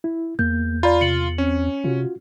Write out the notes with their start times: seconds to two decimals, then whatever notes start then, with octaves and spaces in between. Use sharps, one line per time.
0.04 E4
0.39 E2 A#3 G6
0.83 F4 D5 A#5 B5
1.01 C3 C#7 F#7
1.38 C4 C#4
1.84 C3 F4 F#4